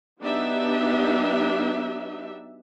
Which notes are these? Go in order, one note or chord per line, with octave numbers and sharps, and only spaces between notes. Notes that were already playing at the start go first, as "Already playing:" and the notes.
F#3 B3 D4 D#4 G4 E5